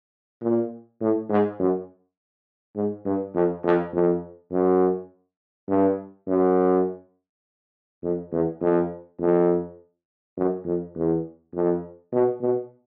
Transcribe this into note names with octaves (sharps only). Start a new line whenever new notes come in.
A#2
A2
G#2
F#2
G#2
G2
F2
F2
F2
F#2
G2
F#2
F2
E2
F2
F2
F#2
F2
E2
F2
B2
B2